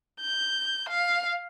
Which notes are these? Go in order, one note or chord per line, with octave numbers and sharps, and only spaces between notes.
G6
F5